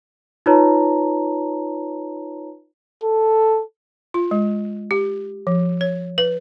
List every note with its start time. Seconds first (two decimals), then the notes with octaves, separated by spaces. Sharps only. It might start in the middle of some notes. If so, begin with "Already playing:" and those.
0.46 D#4 F4 B4 C#5 A5 A#5
3.03 A4
4.14 F4
4.31 G#3
4.91 G4
5.47 F3
5.81 C#5
6.18 B4